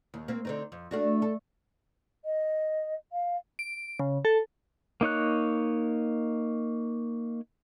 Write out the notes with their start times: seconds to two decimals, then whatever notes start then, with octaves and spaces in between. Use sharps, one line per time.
0.14 D#2
0.28 A#3 C4
0.45 D3 C4 D#4
0.72 F2
0.91 A3 D4 F#4
1.22 A4
2.25 D#5
3.12 F5
3.59 D7
3.99 C#3
4.25 A4
5.01 A#3 D#4 C#5 F#6